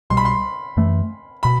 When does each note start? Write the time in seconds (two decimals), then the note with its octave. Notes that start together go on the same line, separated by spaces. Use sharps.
0.10 C2 B2 G3 C6
0.17 B5
0.25 C6
0.77 F#2 E3 A3
1.43 B2 B5